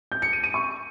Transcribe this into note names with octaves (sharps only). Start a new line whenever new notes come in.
G6
C#7
D#7
D#7
C#6